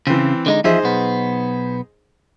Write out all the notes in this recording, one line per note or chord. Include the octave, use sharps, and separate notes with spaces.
C#3 E3 C4
D3 G#3 D#4
E2 F3 D#4 G#4 C5 E5
B1 B3